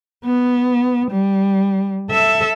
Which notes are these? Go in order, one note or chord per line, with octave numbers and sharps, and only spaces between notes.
B3
G3
A4 E5